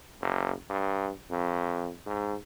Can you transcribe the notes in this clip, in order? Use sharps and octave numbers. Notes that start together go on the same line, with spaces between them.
F#1
G2
F2
G#2